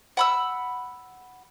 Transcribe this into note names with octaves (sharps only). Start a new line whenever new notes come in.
F#5 B5 E6